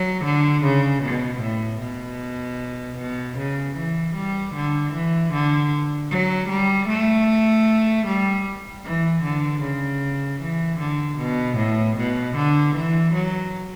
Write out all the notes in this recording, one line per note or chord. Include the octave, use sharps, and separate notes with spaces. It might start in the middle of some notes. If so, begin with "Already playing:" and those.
Already playing: F#3
D3
C#3
B2
A2
B2
B2
C#3
E3
G3
D3
E3
D3
F#3
G3
A3
G3
E3
D3
C#3
E3
D3
B2
A2
B2
D3
E3
F#3